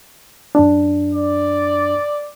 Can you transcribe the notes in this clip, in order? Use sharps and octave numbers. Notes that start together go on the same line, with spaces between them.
F#2 D4
D5